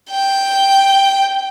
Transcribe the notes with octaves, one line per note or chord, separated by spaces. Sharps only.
G5